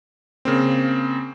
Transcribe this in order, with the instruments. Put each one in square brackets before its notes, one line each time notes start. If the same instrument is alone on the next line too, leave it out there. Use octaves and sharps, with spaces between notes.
[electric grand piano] C#3 A#3 C4